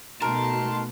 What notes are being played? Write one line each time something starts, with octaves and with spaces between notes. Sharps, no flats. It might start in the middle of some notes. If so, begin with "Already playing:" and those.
B2 A3 D#4 F#4 A#4 A5 C6